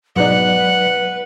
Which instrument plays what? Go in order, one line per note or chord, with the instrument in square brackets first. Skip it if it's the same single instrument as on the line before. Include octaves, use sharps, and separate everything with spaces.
[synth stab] G#2 B2 D#4 [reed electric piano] F#3 D5 [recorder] B4 [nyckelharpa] F#5